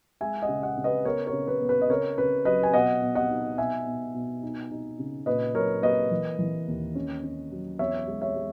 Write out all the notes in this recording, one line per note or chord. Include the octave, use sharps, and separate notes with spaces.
G#3 E5 G#5
D#5 F#5
C#3
D#5 F#5
C#3
B4 D#5
B3 A#4 C#5
A#4 C#5
C#3
B4
B3
B4
D#5
C#3 A#4 C#5
C#3 B4
F#3 B4 D#5
G#5
B2 D#5 F#5
B2
D#5 F#5
D#4
B2 E5 G#5
B2
B2
D#4
D#4
C#3
A#2 B4 D#5
F#3 A#4 C#5
A#3 B4 D#5
E3
E3
D#2
C#4
C#4
F#3
E2 C#5 E5
G#3
C#5 E5
G#3